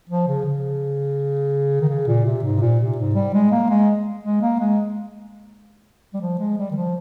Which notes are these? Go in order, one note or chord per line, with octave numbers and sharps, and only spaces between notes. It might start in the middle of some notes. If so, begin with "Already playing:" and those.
F3
C#3
C#3
D#3
C#3
A#2
C3
G#2
C3
A#2
C3
G#2
G3
G#3
A#3
G#3
G#3
A#3
G#3
G3
F3
G#3
G3
D#3
F3